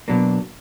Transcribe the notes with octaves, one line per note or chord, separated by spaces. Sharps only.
B2 F#3 A#3 D4